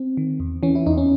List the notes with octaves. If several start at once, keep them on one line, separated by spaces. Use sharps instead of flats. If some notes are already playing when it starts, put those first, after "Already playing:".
Already playing: C4
D#3
E2
E3 C#4
E4
E2 D#4
C#4